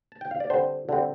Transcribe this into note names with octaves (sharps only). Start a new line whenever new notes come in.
A5
G5
F5
D5
D3 G3 C4 C5
D3 G3 C4